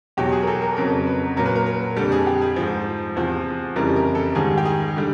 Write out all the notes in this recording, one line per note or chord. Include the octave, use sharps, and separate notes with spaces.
E2 B2 F#3 G4
G#4
A#4
A4
A#4
F2 C#3 F#3 A#4
B4
A#2 F#3 A#4
B4
A#4
A#4
F2 D3 G3 A4
G#4
G4
G#4
G#2 F3
E2 C3 F3
F2 C#3 E3 G3 A#4
A#4
A4
G#2 D#3 G3 G#4
G4
G#4
D3 G3